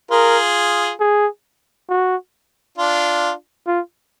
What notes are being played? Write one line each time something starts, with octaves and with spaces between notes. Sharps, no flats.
F4 G#4 A#4
G#4
F#4
D4 F4
F4